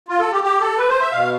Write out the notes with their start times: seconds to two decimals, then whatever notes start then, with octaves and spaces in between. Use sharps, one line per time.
0.08 F4
0.19 A4
0.32 G4
0.44 G4
0.61 A4
0.78 B4
0.89 C5
1.01 E5
1.12 B2 F5